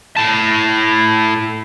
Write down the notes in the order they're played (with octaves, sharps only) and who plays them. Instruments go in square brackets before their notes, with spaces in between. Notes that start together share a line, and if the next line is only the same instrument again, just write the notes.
[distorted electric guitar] A2 A5